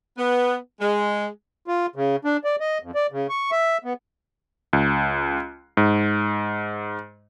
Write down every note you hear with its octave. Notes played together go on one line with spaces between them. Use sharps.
B3
G#3
F4
C#3
D4
D5
D#5
F2
D5
C#3
C#6
E5
B3
C#2
G#2